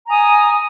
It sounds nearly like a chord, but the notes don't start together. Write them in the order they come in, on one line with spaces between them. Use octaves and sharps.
A#5 G#5 D#6